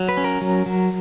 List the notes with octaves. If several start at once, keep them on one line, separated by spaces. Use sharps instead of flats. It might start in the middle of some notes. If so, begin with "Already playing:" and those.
Already playing: F#3
B4
C#4
A#4
F#3
F#3